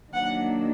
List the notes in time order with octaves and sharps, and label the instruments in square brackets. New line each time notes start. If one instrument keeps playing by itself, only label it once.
[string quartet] D#3 F#3 A#3 D4 F#5